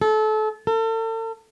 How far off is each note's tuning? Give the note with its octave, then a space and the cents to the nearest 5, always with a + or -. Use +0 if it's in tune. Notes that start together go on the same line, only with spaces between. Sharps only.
A4 -30
A4 +40